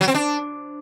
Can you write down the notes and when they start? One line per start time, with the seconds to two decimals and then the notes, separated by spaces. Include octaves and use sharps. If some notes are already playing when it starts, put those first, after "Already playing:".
0.01 F#3
0.08 C4
0.14 D4